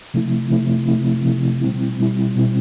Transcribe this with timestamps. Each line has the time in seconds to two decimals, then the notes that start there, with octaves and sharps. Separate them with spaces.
0.14 C3 F3 A3 C4 E4
0.51 C3 F3 A3 C4 E4
0.88 C3 F3 A3 C4 E4
1.25 C3 F3 A3 C4 E4
1.62 B2 G3 C4 E4
1.99 B2 G3 C4 E4
2.35 B2 G3 C4 E4